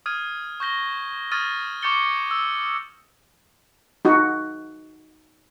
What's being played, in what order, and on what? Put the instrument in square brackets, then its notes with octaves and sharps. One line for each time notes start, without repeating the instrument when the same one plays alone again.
[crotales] D#6 F6 G#6 D#7
C#6 G6 A#6 G7
C#6 D#6 F6 G#6 A6 D#7
C#6 D6 G6 A6 C#7 G7
E6
[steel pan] D#4 F#4